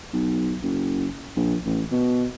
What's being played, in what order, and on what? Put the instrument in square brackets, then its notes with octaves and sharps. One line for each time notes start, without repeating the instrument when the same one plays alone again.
[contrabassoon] B1
F#1
A#1
A1
B2